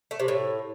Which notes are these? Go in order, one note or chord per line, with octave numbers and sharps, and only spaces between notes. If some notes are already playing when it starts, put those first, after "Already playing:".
A3
C3
A2